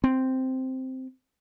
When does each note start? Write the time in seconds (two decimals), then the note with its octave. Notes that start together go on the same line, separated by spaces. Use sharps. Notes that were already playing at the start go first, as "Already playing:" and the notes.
0.04 C4